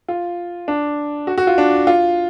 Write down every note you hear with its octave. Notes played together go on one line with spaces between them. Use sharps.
F4
D4
F#4
F#4
F4
D4
F4